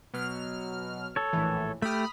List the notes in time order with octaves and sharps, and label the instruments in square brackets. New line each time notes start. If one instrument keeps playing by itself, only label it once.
[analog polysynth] B2 F#3 F6
[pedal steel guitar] A4 C#5
[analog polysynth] A#1 A2 E3
[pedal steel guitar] A3 G4 [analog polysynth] B5 D#6 F6